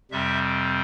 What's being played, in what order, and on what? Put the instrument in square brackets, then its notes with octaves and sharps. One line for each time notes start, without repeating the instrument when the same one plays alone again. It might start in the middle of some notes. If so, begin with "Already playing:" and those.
[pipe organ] F2 C3 G3 C4 E5